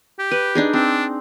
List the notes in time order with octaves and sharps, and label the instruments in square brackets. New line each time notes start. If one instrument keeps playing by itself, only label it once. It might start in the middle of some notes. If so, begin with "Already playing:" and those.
[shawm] G4
[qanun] B4
D4 D#4 G#4
[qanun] C4 [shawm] D4